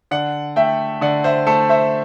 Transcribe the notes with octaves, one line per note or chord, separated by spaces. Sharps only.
D3 D5 F#5
A3 E5 G5
D3 D5 F#5
C5 E5
A3 A4 C5
C5 E5